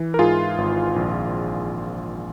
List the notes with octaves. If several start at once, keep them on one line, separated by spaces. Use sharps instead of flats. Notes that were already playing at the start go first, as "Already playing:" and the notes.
Already playing: E3
A#4
G#2 F4 G#4
G#1
A#1